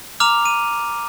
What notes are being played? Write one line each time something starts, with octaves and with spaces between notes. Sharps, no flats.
A#5 D6 F6 F7
D#7